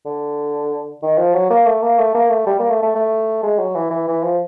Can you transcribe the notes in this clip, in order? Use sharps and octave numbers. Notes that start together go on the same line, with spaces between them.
D3
D#3
F3
F#3
A#3
A3
A#3
A3
A#3
A3
G3
A#3
A3
A3
A3
G#3
F#3
E3
E3
E3
F3